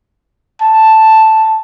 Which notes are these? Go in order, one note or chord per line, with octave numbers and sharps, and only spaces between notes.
A5